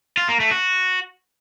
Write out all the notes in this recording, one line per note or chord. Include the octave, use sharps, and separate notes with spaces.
F4
A#3
A3
F#4